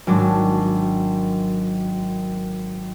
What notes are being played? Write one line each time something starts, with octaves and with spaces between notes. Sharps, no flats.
G#1 F#3 D4